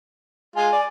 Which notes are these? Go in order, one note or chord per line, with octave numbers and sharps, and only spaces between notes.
G#3 F4 G#5
D5